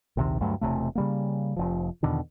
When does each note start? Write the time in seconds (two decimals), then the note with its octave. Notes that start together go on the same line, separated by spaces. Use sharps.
0.17 A#1 D#2 C3 D#3
0.41 D2 G2 F#3 A3
0.61 E1 C#2 C3 A3
0.95 C#3 G3 A#3
1.56 F1 F3
2.03 E2 B2 D3 D#3